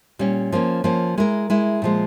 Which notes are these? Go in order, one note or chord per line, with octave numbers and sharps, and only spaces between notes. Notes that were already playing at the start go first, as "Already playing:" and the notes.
A#2 G3 C#4
F3 A#3 C#4
F3 A#3 C#4
G#3 E4 A#4
G#3 E4 A#4
A#2 F3 G#3